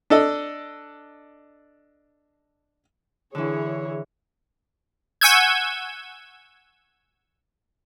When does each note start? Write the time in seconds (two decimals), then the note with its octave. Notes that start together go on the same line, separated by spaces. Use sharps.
0.10 D4 A4 D#5
3.35 D3 E3 E4 G#4 C#5
5.21 F#5 G#5 C#6 E6 G6 G#6